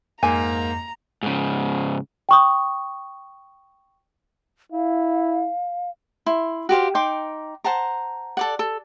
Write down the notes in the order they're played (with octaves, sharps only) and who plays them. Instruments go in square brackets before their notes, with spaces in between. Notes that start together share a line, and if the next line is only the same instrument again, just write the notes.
[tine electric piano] F2 [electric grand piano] G#2 A#3 [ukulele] G#5 [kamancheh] A#5
[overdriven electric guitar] G#2 C#3
[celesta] G5 C#6 D#6
[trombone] E4 [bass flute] F5
[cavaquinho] E4 C6
F#4 G4 C5 F5
D#4 G5 C6 D6
C5 F#5 A5 A#5
A4 D5 F#5
A4